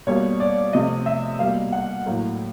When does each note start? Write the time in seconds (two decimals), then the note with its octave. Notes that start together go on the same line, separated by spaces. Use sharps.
0.07 B2 G3 A#3 C#5
0.40 D5
0.73 C3 F3 A3 D#5
1.06 E5
1.39 B2 G3 A#3 F5
1.72 F#5
2.06 A2 F#3 A#3